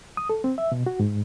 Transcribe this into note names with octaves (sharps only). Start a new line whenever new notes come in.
D#6
A4
C4
E5
B2
F#4
G#2